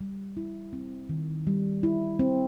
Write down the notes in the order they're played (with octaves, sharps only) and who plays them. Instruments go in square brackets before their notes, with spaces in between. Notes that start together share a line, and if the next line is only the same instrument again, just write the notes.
[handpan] G3
E4
C4
D#3
G3
E4
C4